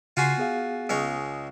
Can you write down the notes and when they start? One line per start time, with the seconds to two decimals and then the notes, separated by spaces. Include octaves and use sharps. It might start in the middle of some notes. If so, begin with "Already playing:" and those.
0.17 C#3 F4 F#4 G#5 C6 C7
0.38 B3 G#4 F5
0.89 C#2 G#3 C#5